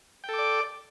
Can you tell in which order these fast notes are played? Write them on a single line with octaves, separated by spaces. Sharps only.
G5 A4 D6 D5